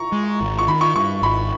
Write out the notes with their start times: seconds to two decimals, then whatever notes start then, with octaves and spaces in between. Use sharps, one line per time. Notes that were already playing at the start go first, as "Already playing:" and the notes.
Already playing: A#5 C#6
0.12 G#3
0.41 G#1
0.59 C#6
0.68 D#3 B5
0.81 C#6
0.96 G2 C#6
1.23 G#1 B5